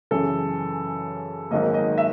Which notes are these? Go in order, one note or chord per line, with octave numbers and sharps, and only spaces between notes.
F#2 C#3 E3 A4
G#1 G#2 D#3 F#3 A#3 D#5
D#5
E5